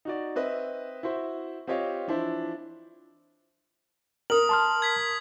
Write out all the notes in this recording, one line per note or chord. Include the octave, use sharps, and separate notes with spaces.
D#4 F#4 D5
C4 B4 D#5 E5
E4 F#4 C5 E5
C4 F4 G4 C#5 D#5 F5
E3 F3 D4 E4 C5
A#4 D#6 F#7
A5 C6 F6
G#6 B6